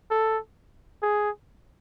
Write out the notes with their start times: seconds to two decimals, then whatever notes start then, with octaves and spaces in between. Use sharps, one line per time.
0.11 A4
1.03 G#4